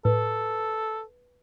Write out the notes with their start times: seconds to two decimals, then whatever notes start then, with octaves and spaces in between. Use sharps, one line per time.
0.05 A2 A4 B4